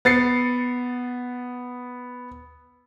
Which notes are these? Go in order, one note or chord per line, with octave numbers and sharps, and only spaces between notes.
B3 A6 C7 C#7